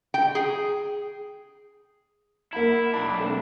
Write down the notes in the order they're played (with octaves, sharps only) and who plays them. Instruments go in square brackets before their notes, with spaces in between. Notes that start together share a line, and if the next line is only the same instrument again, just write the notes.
[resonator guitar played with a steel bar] G5
G#4
[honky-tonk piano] A#3 F#5 B5 [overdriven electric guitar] E4
[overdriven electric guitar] B1 D4 [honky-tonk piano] B5
[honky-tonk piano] A3 C4